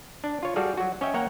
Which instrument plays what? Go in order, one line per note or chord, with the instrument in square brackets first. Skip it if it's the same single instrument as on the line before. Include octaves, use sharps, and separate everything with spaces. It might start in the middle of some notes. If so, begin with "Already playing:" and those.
[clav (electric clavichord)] D4
F4 C#5
G3 F#4 G#4 A4 D5 F5
F#3 F#4
C#4 C#5 D#5 E5 G5
A#3 C#5 F#5 G5 A#5